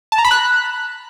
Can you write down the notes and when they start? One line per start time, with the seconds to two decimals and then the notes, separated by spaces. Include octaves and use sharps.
0.12 A5
0.18 A#5
0.25 B5
0.31 F#6